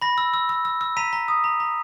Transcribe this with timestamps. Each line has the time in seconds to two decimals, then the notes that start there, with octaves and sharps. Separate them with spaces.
0.02 B5 A#6
0.18 E6
0.34 E6
0.49 E6
0.65 E6
0.81 E6
0.97 A#5 B6 D#7
1.13 A#5
1.28 D#6
1.44 A#5
1.60 A#5